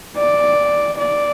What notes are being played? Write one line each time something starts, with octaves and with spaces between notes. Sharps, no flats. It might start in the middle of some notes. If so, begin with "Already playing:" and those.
D5
D5